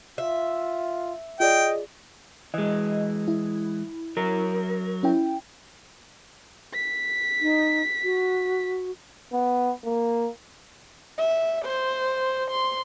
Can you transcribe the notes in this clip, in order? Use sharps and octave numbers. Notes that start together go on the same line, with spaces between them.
F4 E5
F4 G#4 D5 D#5 G5
E3 G#3 D#5
E4
F#3 A#4
C#4 E4 G5
B6
D#4
F#4
B3
A#3
E5
C5
C6